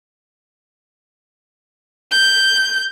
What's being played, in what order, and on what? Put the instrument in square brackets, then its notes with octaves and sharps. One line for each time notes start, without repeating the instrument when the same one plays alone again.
[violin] G6